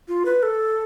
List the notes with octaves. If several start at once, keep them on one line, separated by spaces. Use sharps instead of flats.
F4
B4
A4